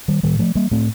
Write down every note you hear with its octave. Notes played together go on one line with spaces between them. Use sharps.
D#3 G3
A2 D#3 G3
F3 A3
G3 A#3
A2 A3 C4